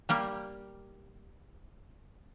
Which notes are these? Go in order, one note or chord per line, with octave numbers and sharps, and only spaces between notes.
G3 A#3 G4